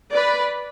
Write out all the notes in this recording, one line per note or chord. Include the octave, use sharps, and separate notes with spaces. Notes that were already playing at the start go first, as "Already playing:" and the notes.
B4 D5